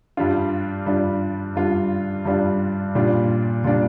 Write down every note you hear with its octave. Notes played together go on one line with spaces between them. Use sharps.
G2 G3 D4 F4
G2 G3 D4 F4
G2 G3 D4 F4
G2 G3 D4 F4
A#2 G3 D4 F4
A#2 G3 D4 F4